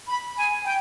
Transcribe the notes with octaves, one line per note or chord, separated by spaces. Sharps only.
B5
G#5
G5